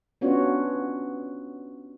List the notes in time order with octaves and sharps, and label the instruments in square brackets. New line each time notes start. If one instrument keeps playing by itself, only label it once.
[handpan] B3 C#4 D4 F4 F#4 C#5